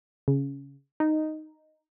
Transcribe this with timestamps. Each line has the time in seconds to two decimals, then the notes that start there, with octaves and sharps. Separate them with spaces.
0.28 C#3
1.00 D#4